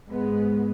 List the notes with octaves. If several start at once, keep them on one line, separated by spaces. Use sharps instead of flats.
G#2 G#3 B3